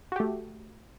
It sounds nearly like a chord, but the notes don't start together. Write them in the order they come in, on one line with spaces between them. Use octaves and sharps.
F#4 G4 A3